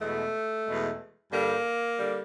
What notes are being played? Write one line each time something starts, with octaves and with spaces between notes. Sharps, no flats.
E2 B2 G#3 A3
E2 B2 G#3
G2 D3 G3 A#3
D3 G3